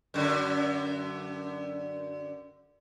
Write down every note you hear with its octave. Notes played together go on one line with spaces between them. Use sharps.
F#2 D3